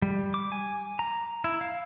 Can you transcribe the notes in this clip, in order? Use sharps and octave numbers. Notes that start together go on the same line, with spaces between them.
G3
D6
G#5
A#5
E4
F5